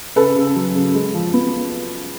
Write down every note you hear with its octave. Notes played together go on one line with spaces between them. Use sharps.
C#3 A4 B4
C#3
F#3
C#3
G#3
F3
B3